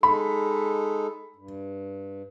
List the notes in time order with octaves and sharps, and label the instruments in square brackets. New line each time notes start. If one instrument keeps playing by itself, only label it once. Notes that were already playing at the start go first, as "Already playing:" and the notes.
[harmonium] G#3 D#4 A4 [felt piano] B5
[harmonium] G2